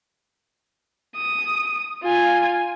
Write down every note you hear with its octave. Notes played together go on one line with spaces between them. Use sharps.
D#6
F4 G#5